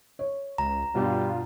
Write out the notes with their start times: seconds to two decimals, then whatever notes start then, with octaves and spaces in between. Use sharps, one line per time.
0.19 C#5
0.58 C#2 A#5
0.95 G2 B2 G3 F4